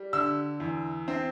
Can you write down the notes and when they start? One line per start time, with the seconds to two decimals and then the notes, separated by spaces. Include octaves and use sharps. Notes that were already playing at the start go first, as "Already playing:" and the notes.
Already playing: G3
0.13 D3 E6
0.60 E2
1.08 C4